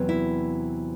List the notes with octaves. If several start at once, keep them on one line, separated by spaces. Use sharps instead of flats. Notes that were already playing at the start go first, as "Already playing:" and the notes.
Already playing: E2 C3 F#3
E4